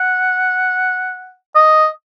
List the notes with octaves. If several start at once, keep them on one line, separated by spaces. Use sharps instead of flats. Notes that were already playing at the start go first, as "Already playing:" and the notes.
Already playing: F#5
D#5